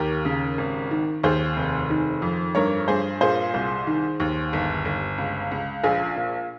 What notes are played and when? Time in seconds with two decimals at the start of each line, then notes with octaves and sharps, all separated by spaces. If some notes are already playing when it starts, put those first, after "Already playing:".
Already playing: D#2 G4 A#4
0.25 C#3
0.58 G#1
0.91 D#3
1.23 D#2 G#4 C5
1.57 F1
1.90 D#3
2.22 F2
2.55 G2 A#4 C#5
2.88 G2 G#4 C5
3.21 A#2 G#4 C5
3.54 C2
3.87 D#3
4.20 D#2
4.53 G1
4.85 G1
5.18 C#2
5.51 C#2
5.84 A#1 F4 G#4
6.16 A#2